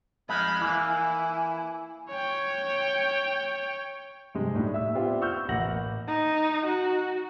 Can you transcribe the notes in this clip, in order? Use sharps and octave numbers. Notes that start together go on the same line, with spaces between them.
F2 G#3 D#4 B5 F6
E3 A#3 E4 G#5
C#5 G5
G2 C3 G#3
A2 G3 D4 D#4
E5 E6
B3 C4 D4 E4 F4 G4
B5 C#6 E6 F6 G6
A1 A#3 E4 F#5 A#6 F#7
D#4
F#4